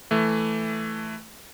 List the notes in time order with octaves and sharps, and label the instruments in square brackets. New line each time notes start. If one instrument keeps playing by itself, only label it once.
[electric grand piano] E3 A3